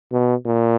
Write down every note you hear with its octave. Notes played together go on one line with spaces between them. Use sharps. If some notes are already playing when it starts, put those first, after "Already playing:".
B2
A#2